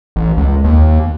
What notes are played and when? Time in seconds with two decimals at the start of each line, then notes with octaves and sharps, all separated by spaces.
0.16 A1
0.37 C#2
0.64 D#2